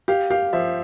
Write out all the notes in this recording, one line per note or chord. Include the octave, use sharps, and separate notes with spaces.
G4 F5
G4 F5
F3 E5